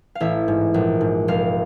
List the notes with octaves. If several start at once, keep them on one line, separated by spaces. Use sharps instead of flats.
F5
A1 E5
G#2
A#1
G#2
F1 F5